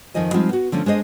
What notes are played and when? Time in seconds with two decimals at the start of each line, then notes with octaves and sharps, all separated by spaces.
0.14 F2 D#3 F3 C5 D#5 G#5
0.33 F3 G3 G#3 C4 D#4 F4
0.49 B3 F#4
0.72 D3 F3 A3 C#4
0.86 G#3 D4 C5 D#5